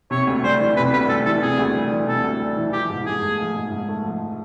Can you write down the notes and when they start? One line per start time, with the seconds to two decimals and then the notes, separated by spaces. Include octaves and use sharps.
0.11 C3 C#5
0.27 D2
0.43 G3 C5
0.61 E3
0.76 C3 B4
0.93 D2 B4
1.09 G3 A4
1.26 E3 A4
1.42 C3 G#4
1.59 D2
1.74 G3
1.91 E3
2.07 C3 A4
2.24 D2
2.40 G3
2.57 E3
2.73 F3 G4
2.90 G#2
3.06 G#2 G#4
3.23 A3
3.39 F3
3.55 G#2
3.72 G#2
3.88 A3
4.04 F3